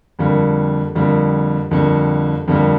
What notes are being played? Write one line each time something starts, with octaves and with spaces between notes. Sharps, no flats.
F2 D3 G3 A#3
F2 D3 G3 A#3
F2 D3 G3 A#3
F2 D3 G3 A#3